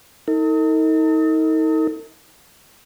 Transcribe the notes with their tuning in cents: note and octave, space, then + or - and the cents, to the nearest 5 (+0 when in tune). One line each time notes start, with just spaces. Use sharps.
D#4 +35 A4 +45